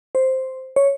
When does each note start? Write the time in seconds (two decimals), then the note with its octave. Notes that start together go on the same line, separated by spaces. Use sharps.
0.15 C5
0.76 C#5